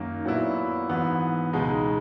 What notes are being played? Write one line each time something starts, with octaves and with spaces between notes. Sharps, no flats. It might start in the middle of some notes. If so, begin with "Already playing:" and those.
Already playing: F#2 D#3 A#3
A#2 F#3 B3 E4
G#2 E3 B3
C#2 B2 G#3 D#4